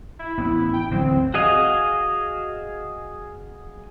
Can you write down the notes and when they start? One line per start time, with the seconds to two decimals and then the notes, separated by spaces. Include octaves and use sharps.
0.19 E4
0.38 A1 B3 C#4
0.73 G5
0.91 A1 D3 F#3 C4
1.03 D1
1.34 F#4 G#4 D#5 F5 G#5